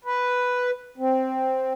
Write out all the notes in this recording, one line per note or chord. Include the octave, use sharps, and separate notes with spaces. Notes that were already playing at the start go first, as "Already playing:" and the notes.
B4
C4